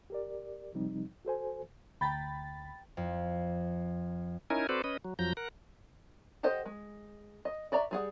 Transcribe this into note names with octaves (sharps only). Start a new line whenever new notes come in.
G4 A#4 D5
C3 F3 G3 C4 D#4
F#4 A4 C5 G#5
D2 G5 A#5 B5 A6
F2
C#4 D#4 E4 A#4 G#5
C4 F#4 A4 B4 C5 D5
C#4 B4 D#5
F#3
F2 F3 F#3 A#5 G6
A#4 F#5
G4 A4 C5 D#5 F#5
G#3
D#5
F#4 D5 E5 A#5
G3 G#4 F#5